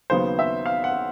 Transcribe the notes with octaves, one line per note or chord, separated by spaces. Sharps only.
D#2 C#3 F#3 B3 C5
E5
F5
F#5